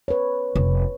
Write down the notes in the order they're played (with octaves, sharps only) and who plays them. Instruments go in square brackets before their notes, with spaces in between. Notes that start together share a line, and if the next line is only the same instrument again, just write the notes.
[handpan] B4 C#5
[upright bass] F1